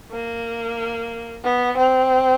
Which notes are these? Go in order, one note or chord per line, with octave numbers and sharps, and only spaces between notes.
A#3
B3
C4